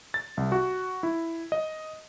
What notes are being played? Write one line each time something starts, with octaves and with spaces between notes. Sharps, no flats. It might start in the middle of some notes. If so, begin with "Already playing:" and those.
A6
C2
F#4
E4
D#5